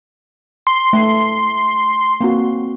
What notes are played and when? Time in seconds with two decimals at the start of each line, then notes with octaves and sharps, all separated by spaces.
0.67 C6
0.93 A3
2.21 A#3 C4 F#4